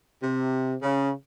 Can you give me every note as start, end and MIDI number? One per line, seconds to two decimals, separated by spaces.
0.23 0.74 48
0.82 1.11 49